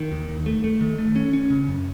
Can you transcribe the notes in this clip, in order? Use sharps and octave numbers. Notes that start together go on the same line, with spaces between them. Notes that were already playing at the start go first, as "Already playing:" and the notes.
Already playing: D#3
D#2
D#2
A3
A3
D#3
A3
C#4
C#4
C#3
F#2